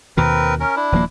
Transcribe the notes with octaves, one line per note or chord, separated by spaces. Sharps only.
D#2 B2 D#3 C4 A#4 B4
C#4 A#4
D4 E4
D#1 F3 A#3